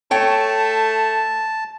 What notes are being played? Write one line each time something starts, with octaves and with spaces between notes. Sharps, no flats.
A3 C#5 G5 A5